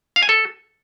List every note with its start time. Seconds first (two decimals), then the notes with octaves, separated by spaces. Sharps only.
0.16 F5
0.23 G#5
0.29 A4